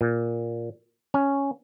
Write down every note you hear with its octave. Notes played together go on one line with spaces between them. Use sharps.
A#2
C#4